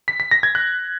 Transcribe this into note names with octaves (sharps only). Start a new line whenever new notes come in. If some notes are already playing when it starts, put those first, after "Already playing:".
B6
B6
A#6
G#6
F#6